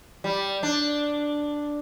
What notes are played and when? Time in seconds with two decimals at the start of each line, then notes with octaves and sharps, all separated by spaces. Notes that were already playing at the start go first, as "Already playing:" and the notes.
0.24 G3
0.63 D4